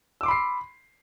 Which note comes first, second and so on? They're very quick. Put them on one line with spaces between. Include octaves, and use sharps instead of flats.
E6 D6 C6 B5 C7